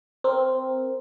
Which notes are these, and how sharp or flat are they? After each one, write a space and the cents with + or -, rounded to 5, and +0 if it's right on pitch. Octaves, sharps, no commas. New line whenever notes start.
C4 +0 A#4 +0